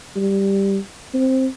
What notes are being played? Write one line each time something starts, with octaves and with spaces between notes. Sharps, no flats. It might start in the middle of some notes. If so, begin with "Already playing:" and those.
G3
C4